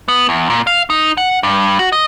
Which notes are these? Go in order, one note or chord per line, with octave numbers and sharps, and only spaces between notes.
B3
E2
A#2
F5
D#4
F#5
G2
F#4
D#5